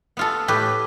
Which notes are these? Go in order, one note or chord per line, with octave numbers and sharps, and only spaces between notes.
B3 F4 A4
A2 G4 B4